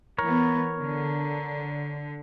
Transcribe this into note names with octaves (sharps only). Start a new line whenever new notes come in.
E3 B3 A#4 C#5
D3